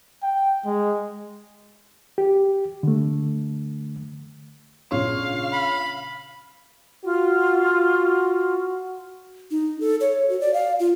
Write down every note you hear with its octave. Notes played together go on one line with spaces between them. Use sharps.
G5
G#3
G4
D3 A3
A#1 C#3 C#5 F5 C6 C#6
B5
F4 F#4
D#4
A4
C#5
F#4
D5
F5
F4